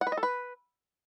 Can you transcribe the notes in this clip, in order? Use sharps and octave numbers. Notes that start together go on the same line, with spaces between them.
F#5
B4
D#5
A4
B4